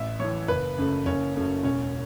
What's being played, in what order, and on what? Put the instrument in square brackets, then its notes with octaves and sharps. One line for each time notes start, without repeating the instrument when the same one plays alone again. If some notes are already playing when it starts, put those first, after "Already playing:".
Already playing: [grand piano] A1 E5
A2 E3 C#5
F#1 B4
F#2 C#3 A3
F#1 C#4
F#2 C#3 A3
E1 C#4